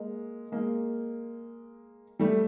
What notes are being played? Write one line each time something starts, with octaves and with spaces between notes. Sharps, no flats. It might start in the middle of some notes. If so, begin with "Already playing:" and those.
Already playing: G#3 A#3
G#3 A#3
G3 A3